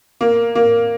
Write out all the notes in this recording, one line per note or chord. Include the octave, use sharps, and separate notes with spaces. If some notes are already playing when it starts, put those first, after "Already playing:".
A#3
A#3